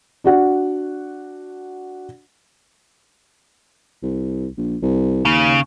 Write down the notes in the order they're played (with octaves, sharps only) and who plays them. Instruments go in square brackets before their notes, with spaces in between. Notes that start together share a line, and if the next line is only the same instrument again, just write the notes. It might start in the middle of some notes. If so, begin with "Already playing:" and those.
[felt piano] D4 F#4 F#5
[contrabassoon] C2
A#1
C2
[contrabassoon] D#2 [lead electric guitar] C#3